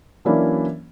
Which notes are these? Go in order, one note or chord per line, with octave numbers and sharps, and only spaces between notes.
E3 F#3 A#3 C#4 D4 E4